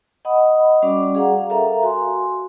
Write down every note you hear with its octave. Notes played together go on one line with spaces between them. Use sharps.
D#5 F#5 B5 D#6
G3 C#4 F#4 D5 D6
G#4 F5 F#5 A#5
F5
A4 A#4 E5 F5 A#5
F#4 G#5 C6